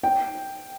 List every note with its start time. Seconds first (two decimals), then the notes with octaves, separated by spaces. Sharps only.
0.03 G5